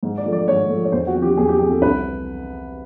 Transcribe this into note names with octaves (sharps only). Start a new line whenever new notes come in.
G#2
D5
F3 A3
D5
G#2 C#5
F3 A3
C#5
E2 C5
F#4
C3 F3
G4
E2 G#4
G4
C3 F3 G#4
A4
C2 B4